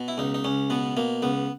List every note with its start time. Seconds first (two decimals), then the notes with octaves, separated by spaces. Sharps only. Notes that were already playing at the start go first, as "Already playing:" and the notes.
Already playing: B2
0.08 E4
0.18 C#2 D#4
0.34 D#4
0.44 C#2 C#4
0.70 B2 B3
0.97 B2 A#3
1.22 C#2 B3